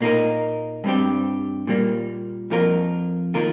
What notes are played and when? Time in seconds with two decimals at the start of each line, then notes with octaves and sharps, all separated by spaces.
0.01 A#2 A#3 D#4 A#4
0.84 G2 G3 C4 G4
1.67 A#2 G3 A#3
2.50 F2 F3 A#3 F4 A#4
3.34 D#3 A#3 F4 A#4